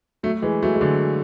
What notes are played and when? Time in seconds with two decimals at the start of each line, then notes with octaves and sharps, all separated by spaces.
0.23 F#3 A3
0.42 E3 G#3
0.62 F#3 A3
0.75 G#3
0.81 D3 F#3